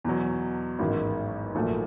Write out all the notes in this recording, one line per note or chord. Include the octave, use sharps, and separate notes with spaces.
E2 B2 F#3
A1 G#2 D#3 F#3
A#1 A#2 F#3 A3